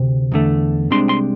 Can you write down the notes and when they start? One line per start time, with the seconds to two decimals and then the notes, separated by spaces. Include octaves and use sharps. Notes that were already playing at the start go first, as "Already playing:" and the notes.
Already playing: D2 C3
0.32 E2 D3 A3
0.90 C2 C3 G#3 D4 C6
1.09 C6